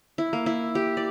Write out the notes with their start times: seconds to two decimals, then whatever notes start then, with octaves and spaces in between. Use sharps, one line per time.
0.18 E4
0.33 A#3
0.46 E4
0.75 G4
0.97 D5